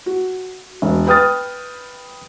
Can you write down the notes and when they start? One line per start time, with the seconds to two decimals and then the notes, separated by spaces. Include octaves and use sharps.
0.06 F#4
0.82 E1
1.07 B4 G5 D#6 F6 A6